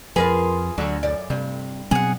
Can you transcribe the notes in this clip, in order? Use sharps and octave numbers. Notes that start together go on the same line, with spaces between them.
F2 F3 F4 G#4 A#4 B4
D2 D3 F#3
F#2 D5
G2 C3
B2 F#3 C4 G#4 F#5